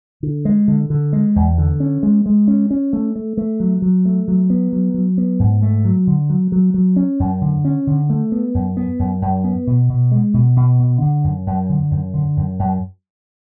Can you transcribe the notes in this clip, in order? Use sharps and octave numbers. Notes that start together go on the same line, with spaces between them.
D3
G#3
D3
D3
G#3
E2
D3
C#4
G#3
G#3
C#4
C#4
A3
A3
A3
F#3
F#3
A3
F#3
B3
F#3
F#3
B3
G#2
A3
F#3
D3
F#3
F#3
F#3
C#4
F#2
D3
C#4
D3
A3
B3
F#2
B3
F#2
F#2
B3
B2
B2
G#3
B2
B2
B2
D3
F#2
F#2
D3
F#2
D3
F#2
F#2